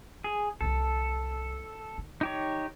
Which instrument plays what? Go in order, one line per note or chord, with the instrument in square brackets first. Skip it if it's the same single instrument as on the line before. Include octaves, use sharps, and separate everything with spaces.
[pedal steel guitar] G#4
[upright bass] C2 E3 [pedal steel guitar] A4
[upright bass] D#3
[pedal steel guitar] D#4 G4 C#5